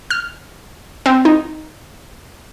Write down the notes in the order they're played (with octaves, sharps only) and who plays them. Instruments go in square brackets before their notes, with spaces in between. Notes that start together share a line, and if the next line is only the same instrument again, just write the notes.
[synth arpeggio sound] F6
C4
D#4